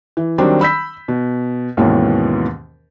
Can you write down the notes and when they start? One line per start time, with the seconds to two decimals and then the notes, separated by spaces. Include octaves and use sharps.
0.17 E3
0.38 D#3 F#3 G3 C4 D4
0.61 B5 E6 G6 B6
1.08 B2
1.77 D#2 G#2 B2 E3 C#4